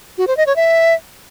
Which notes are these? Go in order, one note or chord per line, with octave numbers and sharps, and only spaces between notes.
F#4
C5
D#5
C#5
E5